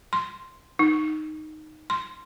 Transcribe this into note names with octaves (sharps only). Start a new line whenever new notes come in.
C6
D#4
C6